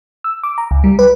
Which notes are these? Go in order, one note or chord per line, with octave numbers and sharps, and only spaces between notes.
E6
D6
A#5
C#2
G3
B4